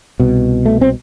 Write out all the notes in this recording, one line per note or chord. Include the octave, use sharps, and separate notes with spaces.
C2 B2
A3
C4